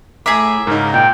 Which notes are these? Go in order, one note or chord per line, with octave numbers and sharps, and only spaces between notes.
A2 G#4 E5 A#5 D6
G#2 C#3 D#4 A#4
A#2 G5